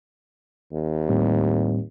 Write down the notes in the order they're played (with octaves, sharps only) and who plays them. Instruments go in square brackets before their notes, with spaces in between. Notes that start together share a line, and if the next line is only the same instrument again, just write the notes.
[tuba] D#2
[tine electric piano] A2 G3 C4